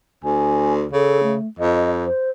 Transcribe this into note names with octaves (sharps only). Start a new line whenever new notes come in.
D2 G#5
C#3 A4
A3
F2 D#5
C5